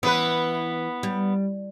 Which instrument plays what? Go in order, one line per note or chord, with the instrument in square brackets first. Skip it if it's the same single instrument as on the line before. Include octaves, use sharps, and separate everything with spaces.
[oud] E3 [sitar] B3 B4
[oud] G3